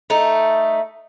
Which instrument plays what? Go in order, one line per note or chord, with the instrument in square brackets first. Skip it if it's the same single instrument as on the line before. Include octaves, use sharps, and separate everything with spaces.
[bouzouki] A3 D#4